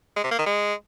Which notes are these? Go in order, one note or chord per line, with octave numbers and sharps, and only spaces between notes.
G#3
C3
A#3
D#3
G#3